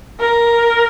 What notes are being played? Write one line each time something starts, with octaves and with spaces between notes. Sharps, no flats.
A#4